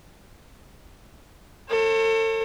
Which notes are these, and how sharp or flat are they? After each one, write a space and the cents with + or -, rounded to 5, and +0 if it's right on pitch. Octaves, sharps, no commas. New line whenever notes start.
A4 +30 C#5 -40